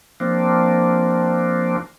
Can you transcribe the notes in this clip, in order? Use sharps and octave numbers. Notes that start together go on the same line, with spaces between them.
F3 A#3 C4 D4